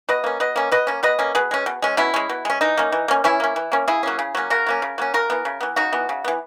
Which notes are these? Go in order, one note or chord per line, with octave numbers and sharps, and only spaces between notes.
B2 B4 D#5
A#3 C#4
B2 B4 D#5
A#3 C#4
B2 B4 D#5
A#3 C#4
B2 B4 D#5
A#3 C#4
B2 G#4 B4
G#3 C#4
B2
G#3 C#4
B2 C#4 E4
G#3 C#4
B2
G#3 C#4
E3 D#4
A#3 C#4
E3
A#3 C#4
E3 C#4 E4
A#3 C#4
E3
A#3 C#4
C#3 E4 G#4
F#3 A#3 C#4
C#3
F#3 A#3 C#4
C#3 F#4 A#4
F#3 A#3 C#4
C#3
F#3 A#3 C#4
C#3 F#4 A#4
E3 B3
C#3
E3 B3
C#3 D#4 F#4
E3 B3
C#3
E3 B3